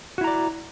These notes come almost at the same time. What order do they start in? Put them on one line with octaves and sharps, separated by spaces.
F#4 E4 A#5 D5